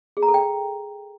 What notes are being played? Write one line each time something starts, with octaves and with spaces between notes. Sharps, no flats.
G#4
A#5
A4
G5